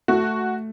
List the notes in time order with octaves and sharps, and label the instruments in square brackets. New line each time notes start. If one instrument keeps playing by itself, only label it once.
[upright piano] A3 [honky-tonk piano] F#4